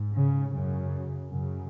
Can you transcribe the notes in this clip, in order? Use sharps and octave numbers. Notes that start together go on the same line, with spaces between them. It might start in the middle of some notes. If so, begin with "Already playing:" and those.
Already playing: G#2
C#3
F#2 C#3
F#2 C#3